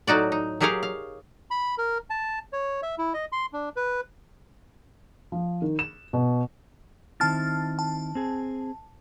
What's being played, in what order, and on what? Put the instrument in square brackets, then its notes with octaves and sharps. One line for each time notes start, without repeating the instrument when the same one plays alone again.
[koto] A2 F#3 D#4 F#4 D5
D#4
F#3 G4 G#4 A#4 C#5 F5
F5
[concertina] B5
A#4
A5
C#5
E5
E4
D#5
C6
D4
B4
[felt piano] F3
D#3
E7
B2
[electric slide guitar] D#3 C4 E4 [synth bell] A5 F6 A6
[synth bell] A5
[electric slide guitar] C4 G#4